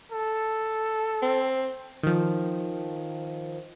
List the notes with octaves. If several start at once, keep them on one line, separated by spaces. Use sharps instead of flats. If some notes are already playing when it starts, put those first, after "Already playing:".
A4
C4
D#3 F3